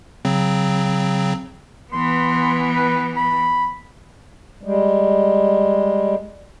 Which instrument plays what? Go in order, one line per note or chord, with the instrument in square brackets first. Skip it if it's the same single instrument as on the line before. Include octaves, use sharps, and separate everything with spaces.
[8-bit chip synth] C#3 F#3 C4
[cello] E3 B3 [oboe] C6
[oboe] B4
B5
[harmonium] G3 G#3